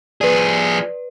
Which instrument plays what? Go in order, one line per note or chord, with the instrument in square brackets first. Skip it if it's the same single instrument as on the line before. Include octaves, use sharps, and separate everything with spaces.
[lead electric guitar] F3 G#4 [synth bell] B4 D5